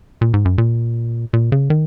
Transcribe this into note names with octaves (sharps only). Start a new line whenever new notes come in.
A#2
G#2
F#2
A#2
A#2
C#3
D#3